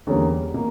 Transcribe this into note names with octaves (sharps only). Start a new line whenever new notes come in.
E2 D3 G3 A#3 C#4
B2 A#3